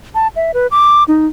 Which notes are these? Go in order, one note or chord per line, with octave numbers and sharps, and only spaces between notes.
A5
E5
B4
D6
D#4